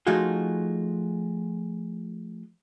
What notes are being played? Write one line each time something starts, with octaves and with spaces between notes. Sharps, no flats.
F3 A3 D#4 F4 F#4 G#4